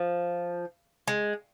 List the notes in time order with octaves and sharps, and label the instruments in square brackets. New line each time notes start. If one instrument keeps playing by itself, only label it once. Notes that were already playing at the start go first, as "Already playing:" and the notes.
Already playing: [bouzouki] F3
G#3